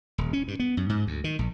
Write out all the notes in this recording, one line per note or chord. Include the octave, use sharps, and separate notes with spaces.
D#1
C#4
G2
B3
F#2
G#2
D2
D#3
A#1